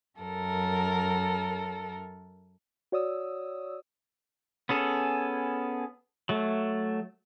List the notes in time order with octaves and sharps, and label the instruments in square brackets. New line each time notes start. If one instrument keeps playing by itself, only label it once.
[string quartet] F#2 A4 A#4
[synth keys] F#4 C#5 D5 D#6 E6
[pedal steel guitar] B3 C#4 G#4 A4
F#3 A3